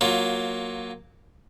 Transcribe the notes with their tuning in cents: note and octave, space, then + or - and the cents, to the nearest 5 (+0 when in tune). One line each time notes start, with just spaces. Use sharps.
F#3 +0 A#3 +0 F4 +20